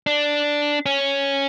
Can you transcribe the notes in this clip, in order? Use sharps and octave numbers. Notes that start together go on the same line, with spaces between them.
D4
C#4